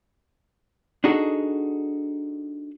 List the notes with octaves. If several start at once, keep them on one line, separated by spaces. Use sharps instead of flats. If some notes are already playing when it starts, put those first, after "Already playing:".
D4 D#4 F#4 G#4 A4